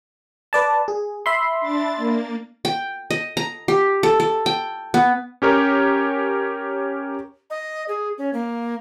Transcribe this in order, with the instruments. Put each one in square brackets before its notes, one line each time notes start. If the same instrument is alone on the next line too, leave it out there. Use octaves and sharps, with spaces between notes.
[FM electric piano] B4 D5 A5
G#4
E5 B5 C6
[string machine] D4 A6
A#3
[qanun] G5
D#5
A#5
G4
A4
A4
G5
B3
[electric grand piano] C#4 G4 A#4 C#5
[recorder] D#5
G#4
C#4
A#3